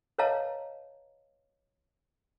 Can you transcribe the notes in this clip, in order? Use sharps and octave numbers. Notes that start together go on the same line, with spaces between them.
B4 C#5 D#5 F5 A5 A#5